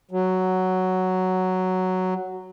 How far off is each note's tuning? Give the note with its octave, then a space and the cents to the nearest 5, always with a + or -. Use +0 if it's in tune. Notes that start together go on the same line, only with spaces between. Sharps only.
F#3 +5